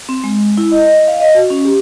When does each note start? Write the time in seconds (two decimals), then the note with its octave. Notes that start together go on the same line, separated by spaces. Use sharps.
0.09 C4
0.24 G#3
0.58 E4
0.72 D#5
0.86 D#5
1.08 F5
1.20 D#5
1.35 F#4
1.50 C#4
1.65 G4